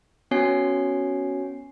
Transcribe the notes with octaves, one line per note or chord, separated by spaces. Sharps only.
B3 C#4 F#4 C#5 G#5 C7